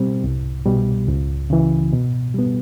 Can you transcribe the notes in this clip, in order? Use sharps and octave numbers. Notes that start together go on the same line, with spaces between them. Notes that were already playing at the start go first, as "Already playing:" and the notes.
Already playing: B2 G3 C4
C2
B2 G3
C#2
C#3 E3
B2
G3 B3